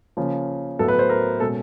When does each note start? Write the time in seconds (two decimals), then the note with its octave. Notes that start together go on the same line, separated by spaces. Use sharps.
0.17 C#3 F3 A#3 C#4
0.79 A2 F#3 B3 A4
0.88 B4
0.99 C5
1.09 A#4
1.40 B2 G#3 C#4 A4